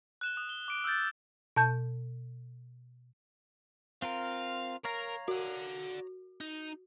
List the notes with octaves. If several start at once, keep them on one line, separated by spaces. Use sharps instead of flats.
F#6 E7 G7
D#6 F#6
G7
D6 D7
E6 F6 G6 A6
B2 A5 G6
C4 F4 A#4 F5
A#4 C#5 F5 A#5
F#4 D5 F#5
D#4